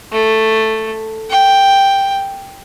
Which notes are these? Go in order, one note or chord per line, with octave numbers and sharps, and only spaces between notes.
A3
G5